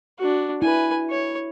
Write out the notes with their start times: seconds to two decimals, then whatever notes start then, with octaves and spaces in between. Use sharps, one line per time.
0.18 D4 F#4
0.62 E4 B4 G#5
1.10 C#5